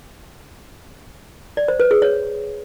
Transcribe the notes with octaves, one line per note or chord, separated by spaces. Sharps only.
D5
C5
B4
G#4
C#5